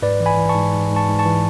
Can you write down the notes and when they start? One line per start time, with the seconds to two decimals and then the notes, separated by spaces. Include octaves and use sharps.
0.02 G#2 B4 D5
0.20 E3
0.26 G#5 B5
0.37 E3
0.49 A5 C#6
0.55 G#2
0.73 G#2
0.91 G#2
0.96 A5 C#6
1.08 G#2
1.19 A5 C#6
1.25 E3